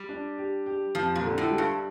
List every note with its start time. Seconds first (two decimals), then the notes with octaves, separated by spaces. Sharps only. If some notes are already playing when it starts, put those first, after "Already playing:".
Already playing: G3
0.09 D4
0.38 G4
0.66 G4
0.95 F2 F3
1.15 A#2
1.23 D3
1.38 A2
1.51 G3
1.58 G2